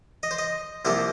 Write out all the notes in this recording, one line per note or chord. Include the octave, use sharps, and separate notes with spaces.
D#5
C5
D#5
C2 C3 F3 A#3 C5